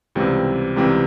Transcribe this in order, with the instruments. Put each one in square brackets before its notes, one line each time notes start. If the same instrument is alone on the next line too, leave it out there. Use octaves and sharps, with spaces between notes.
[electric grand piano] C#2 C3 E3 G3 C4
C#2 C3 E3 G3 C4